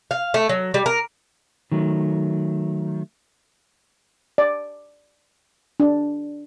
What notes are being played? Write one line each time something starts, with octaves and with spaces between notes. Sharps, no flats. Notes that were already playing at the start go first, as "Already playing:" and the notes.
F5
A3
F#3
G3
A#4
D#3 F#3 A3
D5
D4